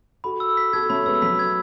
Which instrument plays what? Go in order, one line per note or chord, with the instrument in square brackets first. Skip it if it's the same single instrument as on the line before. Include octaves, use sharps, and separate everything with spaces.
[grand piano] F#4 A4 [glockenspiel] B5
[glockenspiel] E6
B6
[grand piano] F#4 A4 [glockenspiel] G#6
[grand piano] A3 C#4 [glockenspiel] B5
[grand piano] G#3 B3 [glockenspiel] E6
[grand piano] F#3 A3 [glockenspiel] B6
[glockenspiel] G#6